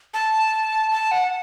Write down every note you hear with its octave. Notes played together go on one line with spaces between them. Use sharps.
A5
A5
F#5